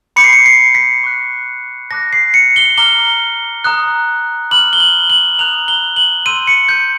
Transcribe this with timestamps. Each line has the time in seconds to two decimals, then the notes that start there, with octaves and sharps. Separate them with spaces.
0.16 B5 D6 G6 C#7
0.24 C7
0.33 C#7
0.46 C7
0.75 B6
1.04 C#6 F#6
1.91 A5 D6 F#6 A#6
2.13 C7
2.34 C#7
2.56 G7
2.78 A#5 D6 F6 G7
3.64 A#5 D#6 F#6
4.51 B5 D6 F6 F#7
4.73 G7
4.80 F#7
5.10 F#7
5.39 A#5 D#6 F#6 F7
5.68 G7
5.96 F#7
6.26 C6 E6 G6 D#7
6.47 C#7
6.69 G6